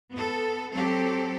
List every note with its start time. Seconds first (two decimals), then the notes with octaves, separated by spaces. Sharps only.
0.11 B3 A4
0.73 F#3 C4 G4 A4